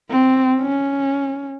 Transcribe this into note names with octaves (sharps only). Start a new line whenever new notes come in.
C4
C#4